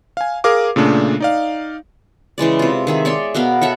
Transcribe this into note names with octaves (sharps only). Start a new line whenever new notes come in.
F5 G#5
G#4 A#4 F5 D6
A#2 C#3 A3 D4
D#4 D5 F5
C#3 E3 G#3 D5
C3 F4
D#3 G#4 E5
C#5 D5 E5 C6
B2 B3 A#4 F5
A4 C#5 E5 F#5